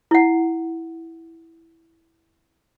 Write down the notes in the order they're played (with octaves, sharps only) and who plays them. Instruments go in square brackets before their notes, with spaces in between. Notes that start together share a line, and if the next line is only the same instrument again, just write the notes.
[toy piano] E4 F#5